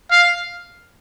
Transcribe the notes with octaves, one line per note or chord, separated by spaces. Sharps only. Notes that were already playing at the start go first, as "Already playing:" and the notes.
F5